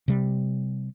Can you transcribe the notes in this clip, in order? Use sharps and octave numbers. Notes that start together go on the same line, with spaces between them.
C3 G3